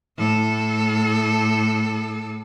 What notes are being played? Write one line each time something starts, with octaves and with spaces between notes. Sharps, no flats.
A2 A4